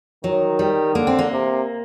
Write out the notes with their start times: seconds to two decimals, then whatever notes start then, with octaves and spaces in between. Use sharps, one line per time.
0.24 D#3 F#3
0.59 G3
0.95 D3 A#3
1.07 C4
1.19 A#3
1.31 C3